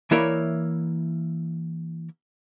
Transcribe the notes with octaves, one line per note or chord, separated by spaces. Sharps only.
E3 A#3 E4 A#4 C#5 D5